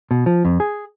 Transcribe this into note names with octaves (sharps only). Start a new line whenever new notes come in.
B2
F3
F2
G#4